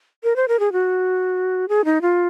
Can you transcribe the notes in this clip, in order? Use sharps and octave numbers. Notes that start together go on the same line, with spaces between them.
A#4
C5
A#4
G#4
F#4
G#4
D#4
F4